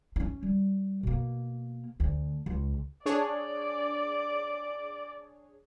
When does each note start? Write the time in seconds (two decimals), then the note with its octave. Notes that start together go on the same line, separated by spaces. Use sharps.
0.16 C#4 D4
0.43 G3
1.03 B2 A#3
2.00 D2
2.46 C#2
3.06 D4 G#4 C#5 D5